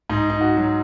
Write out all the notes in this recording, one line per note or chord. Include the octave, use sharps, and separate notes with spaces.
G#2 D#4
D#4
F#4
F#3